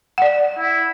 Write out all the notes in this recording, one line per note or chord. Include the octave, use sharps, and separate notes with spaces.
D5 F#5
E4